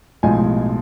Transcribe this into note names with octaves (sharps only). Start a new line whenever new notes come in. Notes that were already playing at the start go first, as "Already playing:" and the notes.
B1 A2 F3 G#3 G#5